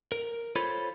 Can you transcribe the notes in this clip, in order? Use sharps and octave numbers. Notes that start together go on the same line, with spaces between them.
A#4
F4 A4 C5 C#5 B5